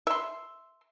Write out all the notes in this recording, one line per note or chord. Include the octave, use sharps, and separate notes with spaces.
E5 C6